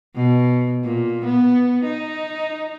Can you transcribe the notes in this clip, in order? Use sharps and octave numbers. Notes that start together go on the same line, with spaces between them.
B2
A#2
B3
D#4